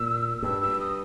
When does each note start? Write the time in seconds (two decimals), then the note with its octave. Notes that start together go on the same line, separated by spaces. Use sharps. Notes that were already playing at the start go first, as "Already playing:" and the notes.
Already playing: A#2 E6
0.42 G2 E6
0.62 E6
0.80 D#6